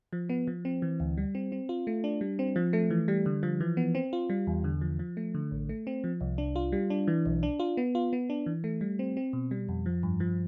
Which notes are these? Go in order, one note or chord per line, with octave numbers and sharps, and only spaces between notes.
F3
B3
F3
C4
E3
D2
G3
C4
C4
F4
A3
D4
G3
C4
F3
A3
E3
G3
D3
F3
E3
B3
C4
F4
G3
E2
D3
F3
F3
A3
D3
A1
A3
C4
F3
C2
D4
F4
G3
D4
E3
B1
D4
F4
B3
F4
B3
D4
E3
A3
G3
C4
C4
B2
G3
F2
F3
G2
F3